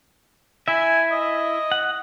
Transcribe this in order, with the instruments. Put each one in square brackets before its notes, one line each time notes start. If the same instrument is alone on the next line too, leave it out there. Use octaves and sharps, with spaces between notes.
[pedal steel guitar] E4 E5 [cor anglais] G#5
[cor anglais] D#5
[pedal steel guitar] F#5